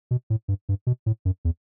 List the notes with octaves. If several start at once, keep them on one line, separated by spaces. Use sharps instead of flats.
B2
A2
G2
G2
B2
A2
F#2
E2